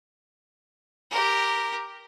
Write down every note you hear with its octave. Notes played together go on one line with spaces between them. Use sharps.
G4 A#4